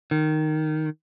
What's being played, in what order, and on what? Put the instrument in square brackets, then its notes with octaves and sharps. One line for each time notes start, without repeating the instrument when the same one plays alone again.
[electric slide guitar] D#3